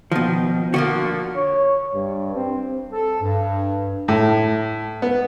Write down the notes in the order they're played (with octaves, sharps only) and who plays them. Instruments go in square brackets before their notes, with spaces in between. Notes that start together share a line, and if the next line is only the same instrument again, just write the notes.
[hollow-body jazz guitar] B2 F3 [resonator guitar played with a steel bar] D#3
[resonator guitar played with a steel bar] D3 F3 A#3 [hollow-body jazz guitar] F#4
[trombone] C#5
G2
C4
[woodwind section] A4
G2
[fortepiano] A2
B3